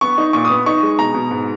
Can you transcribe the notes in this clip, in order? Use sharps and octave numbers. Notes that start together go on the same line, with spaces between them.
B3 C#6
D#4
A#2 C#6
D#6
B3
D#4 C#6
G#3
B2 A#5
B2
G#2